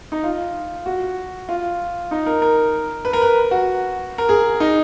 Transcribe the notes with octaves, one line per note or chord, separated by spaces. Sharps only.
D#4
F4
F#4
F4
D#4
A#4
A#4
B4
A#4
B4
F#4
A#4
G#4
D#4